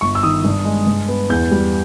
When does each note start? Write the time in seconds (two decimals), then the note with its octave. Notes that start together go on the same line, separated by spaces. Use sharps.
0.01 G1 C#6
0.15 E6
0.23 D#3 D#6
0.45 G2
0.65 G#3
0.87 G2
1.08 B3
1.29 E2 G6
1.51 G3